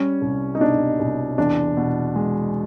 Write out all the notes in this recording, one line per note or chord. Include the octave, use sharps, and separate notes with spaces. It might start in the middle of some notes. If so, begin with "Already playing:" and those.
Already playing: G3 C#4
C2
D#4
B2 D4
C2
E2 D4
B2
G#3